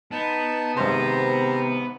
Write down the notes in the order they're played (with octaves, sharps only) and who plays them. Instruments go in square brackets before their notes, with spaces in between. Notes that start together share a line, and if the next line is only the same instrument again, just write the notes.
[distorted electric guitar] B3 [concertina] D#4 A5
[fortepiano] G#1 C6 [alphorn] C3 [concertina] C5 A#5